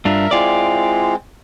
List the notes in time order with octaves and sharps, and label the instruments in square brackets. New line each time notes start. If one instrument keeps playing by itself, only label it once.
[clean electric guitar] G2 D4 F4 [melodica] A#4 E5
[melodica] G#3 C4 [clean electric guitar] E4 F4 D5